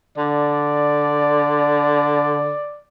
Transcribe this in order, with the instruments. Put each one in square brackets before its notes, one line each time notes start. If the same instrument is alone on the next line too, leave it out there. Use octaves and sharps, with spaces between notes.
[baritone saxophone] D3 [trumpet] D5